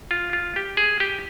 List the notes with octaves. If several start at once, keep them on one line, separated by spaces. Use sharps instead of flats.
F4
F4
G4
G#4
G4